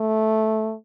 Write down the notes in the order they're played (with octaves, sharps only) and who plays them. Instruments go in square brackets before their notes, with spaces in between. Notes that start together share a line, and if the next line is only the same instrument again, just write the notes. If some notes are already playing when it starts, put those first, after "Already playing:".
Already playing: [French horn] A3